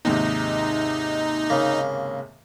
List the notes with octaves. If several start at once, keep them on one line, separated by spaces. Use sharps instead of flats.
D#2 G#2 C3 D#4
C#3 A#3